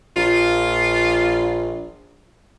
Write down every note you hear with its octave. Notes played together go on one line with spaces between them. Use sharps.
A#1 F4